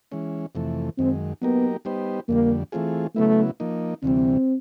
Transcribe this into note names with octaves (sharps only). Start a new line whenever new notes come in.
E3 G#3 C#4
F2 C3 E3 A3
F#2 D#3 G#3 C4
F#3 A#3 B3 D#4 G4 A#4
G3 B3 D#4 G4 C5
F2 D3 G3 A#3
E3 A3 C4 F4 G#4
C#3 F#3 A3 B3 E4
F3 A#3 D#4
D2 C3 E3 G3 C4